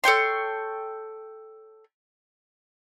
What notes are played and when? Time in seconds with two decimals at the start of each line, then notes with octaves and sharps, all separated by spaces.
0.04 A4 C#5 G5 C6